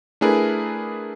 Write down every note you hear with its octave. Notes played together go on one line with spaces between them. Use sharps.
A3 D4 E4 G#4 A#4 B4